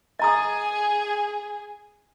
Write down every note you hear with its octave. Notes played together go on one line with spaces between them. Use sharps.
G#4 D#5 G#5 A#5 D#6